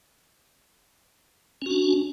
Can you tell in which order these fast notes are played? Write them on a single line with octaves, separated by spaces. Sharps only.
C#4 F#4 D4